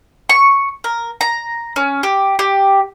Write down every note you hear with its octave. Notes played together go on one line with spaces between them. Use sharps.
C#6
A#4
A#5
C#4
G4
G4